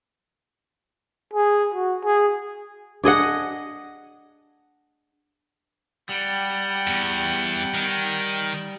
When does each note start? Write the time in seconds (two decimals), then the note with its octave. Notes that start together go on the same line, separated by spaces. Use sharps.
1.34 G#4
1.74 F#4
2.04 G#4
3.03 D4 G#4 D#5 F#5
6.09 G3 F#5 G5
6.88 E2
7.75 D#3